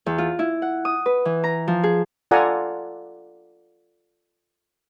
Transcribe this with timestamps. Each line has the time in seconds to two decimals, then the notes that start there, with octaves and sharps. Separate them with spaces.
0.06 E2
0.18 F4
0.39 E4
0.62 F#5
0.85 D#6
1.06 B4
1.25 E3
1.44 A#5
1.68 F3
1.83 G#4
2.31 F4 A4 D5 F#5 G#5 A#5